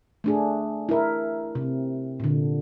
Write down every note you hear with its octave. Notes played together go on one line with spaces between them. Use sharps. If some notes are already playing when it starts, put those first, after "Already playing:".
A3 D4 G#4
E4 A#4
C3
A#2 D3